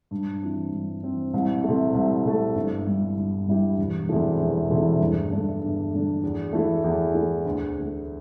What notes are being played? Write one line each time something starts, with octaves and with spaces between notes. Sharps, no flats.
G2
E3 C4
G2
E3 C4
C2
C3 A3
C2
C3 A3
G1
G2 G3 E4 G4
G1
G2 G3 E4 G4
E1
E2 C3 E3 A3
E1
E2 C3 E3 A3
G1
G2 D3 A3 D4
G1
G2 D3 A3 D4
E2
E3 A3
E2
E3 A3
D2
D3 A3